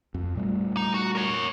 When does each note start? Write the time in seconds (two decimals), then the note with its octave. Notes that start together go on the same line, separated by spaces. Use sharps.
0.14 F2
0.35 A#2 G3 A3
0.77 D#4
0.94 F#4
1.15 A#4 C#5